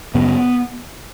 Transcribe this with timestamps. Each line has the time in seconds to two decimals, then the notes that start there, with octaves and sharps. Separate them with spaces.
0.14 F#2 C#3 B3